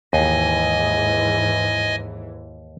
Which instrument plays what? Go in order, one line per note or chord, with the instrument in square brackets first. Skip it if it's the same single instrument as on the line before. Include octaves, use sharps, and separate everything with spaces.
[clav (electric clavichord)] D#2 [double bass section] G#2 E3 [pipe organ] D#5 G#5